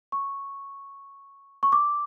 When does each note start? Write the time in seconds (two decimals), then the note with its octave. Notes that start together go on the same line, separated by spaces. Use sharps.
0.12 C#6
1.63 C#6
1.72 D6